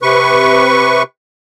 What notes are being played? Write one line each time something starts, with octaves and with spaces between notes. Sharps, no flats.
C3 B4 C#6